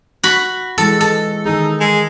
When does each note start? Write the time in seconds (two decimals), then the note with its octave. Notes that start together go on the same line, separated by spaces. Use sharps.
0.23 F#4 B5
0.78 E3 G#3 A4
1.01 A4
1.46 D#3 D#4 G#4
1.80 G#3